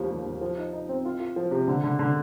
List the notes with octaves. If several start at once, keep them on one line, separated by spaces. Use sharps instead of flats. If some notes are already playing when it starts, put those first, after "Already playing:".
Already playing: D#2 F3 G3
D#2
D#2
F3
D#4
D#4
C4
F4
F4
F3
C3
D3
D3
D3